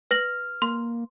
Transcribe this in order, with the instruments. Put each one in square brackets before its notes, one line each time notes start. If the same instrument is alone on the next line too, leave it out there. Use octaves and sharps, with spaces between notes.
[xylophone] B4 A#6 F#7 [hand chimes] F6
[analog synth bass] A#3 [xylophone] C6